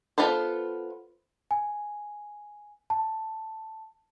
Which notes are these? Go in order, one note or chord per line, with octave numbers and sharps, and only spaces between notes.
B3 F4 A4 B4 C5
G#5
A5